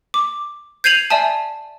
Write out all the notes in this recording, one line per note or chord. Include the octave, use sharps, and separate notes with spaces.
D6
G6 G#6 C7 D#7 F7 F#7
D5 E5 G#5 A5